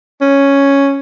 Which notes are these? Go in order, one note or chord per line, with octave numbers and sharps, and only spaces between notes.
C#4